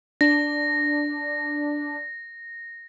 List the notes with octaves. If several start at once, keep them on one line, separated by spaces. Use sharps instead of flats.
D4 A#6